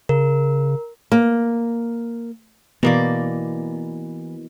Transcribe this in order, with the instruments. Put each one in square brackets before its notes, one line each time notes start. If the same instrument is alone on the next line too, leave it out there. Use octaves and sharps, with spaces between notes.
[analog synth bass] C#3 [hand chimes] A#4
[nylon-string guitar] A#3
[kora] B2 A#3 D5 [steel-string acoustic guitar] E3 [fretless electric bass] B3